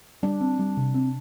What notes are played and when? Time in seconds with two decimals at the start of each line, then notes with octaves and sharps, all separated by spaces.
0.23 G3 D4
0.41 C4
0.59 G3
0.77 C3
0.94 C4